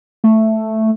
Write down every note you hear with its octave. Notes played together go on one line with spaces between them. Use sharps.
A3